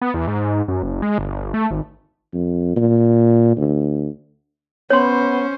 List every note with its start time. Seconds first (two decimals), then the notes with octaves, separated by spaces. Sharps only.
0.02 B3
0.14 E2
0.28 G#2
0.68 F#2
0.83 F#1
1.02 G#3
1.18 G1
1.54 A3
1.71 G#1
2.34 F2
2.76 A#2
3.57 D2
4.90 B3 C#4 C5 C#5 C6